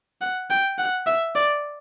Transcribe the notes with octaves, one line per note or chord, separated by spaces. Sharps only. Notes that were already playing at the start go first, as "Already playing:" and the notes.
F#5
G5
F#5
E5
D5